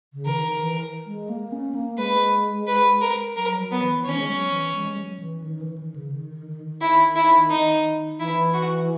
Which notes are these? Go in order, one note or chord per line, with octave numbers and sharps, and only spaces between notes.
C#3
E3 A#4
D#3
E3
G#3
A#3
C#4
A#3
G#3 B4
B4
A#4
F#3 A#4
F#3
B3
E3
E3
D#3 C#4
G#3
F#3
E3
G#3
G#3
F#3
E3
D#3
E3
D#3
C#3
D#3
D#3
D#3
D#3
E4
E4
D#4
E3 E4
F#4